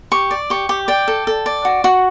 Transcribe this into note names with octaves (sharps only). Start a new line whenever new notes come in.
G4 C#6
D5
G4 C#6
G4
D5 G5
A4
A4
D5
F#4
F#4